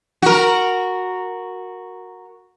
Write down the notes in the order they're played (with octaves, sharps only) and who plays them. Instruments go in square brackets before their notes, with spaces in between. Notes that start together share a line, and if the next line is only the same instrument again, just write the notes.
[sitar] F#4 A#4